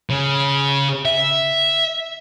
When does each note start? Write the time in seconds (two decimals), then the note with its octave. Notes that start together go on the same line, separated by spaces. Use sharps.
0.10 C#3
1.05 E5